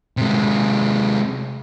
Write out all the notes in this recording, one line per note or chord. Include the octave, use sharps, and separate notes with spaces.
C3 G#3